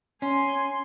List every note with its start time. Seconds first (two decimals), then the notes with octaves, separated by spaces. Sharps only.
0.22 C#4 G#5 C6